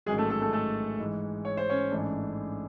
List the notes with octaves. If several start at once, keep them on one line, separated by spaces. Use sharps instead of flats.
A1 G#2 D#3 F#3 G#3 G#4
A3 A4
A3 A4
A3 A4
A3 A4
G#2 E3 G#3
C#5
C5
C#4 C#5
A1 G#2 E3 A3 D4